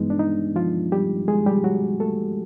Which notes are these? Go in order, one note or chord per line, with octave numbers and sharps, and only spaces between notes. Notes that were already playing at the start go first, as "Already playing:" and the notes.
Already playing: G2 E3 G#3 B3 D#4
D4
D#4
F3 F4
G3 G4
G#3 G#4
G3 G4
F#3 F#4
A3 A4